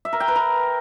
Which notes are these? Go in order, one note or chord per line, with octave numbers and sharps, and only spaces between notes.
E5
A#4
G5
B4
A#4